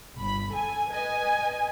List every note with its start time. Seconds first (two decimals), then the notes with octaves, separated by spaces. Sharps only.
0.17 G1 B5
0.52 A4 G#5
0.91 B4 D#5 G#5